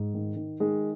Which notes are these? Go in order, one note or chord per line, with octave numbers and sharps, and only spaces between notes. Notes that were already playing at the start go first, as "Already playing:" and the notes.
Already playing: G#2
D#3
D#3
D#3 G#3